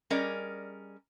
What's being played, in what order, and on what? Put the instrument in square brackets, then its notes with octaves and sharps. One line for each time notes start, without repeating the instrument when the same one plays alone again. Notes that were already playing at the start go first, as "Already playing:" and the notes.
[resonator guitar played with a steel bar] G3 C#4 G#4 A#4 D5 D#5